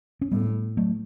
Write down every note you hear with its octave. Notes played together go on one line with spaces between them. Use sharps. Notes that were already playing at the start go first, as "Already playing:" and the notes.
C#4
A2 G3 B3
F#3 A3